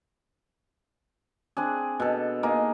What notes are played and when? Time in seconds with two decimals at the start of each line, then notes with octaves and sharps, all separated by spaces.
1.57 C4 D4 G#4
2.00 B2 A4
2.43 A#3 D#4 G#4